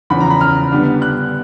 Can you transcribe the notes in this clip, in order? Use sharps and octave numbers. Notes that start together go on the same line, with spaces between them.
E2 C#3 F3 B5
A#5
B5
F6
D3 G3 B3 D4
F#6